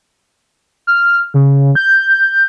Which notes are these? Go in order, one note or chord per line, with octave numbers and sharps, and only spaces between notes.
F6
C#3
G6